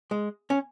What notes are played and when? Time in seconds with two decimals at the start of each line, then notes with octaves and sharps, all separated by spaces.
0.11 G#3
0.50 C#4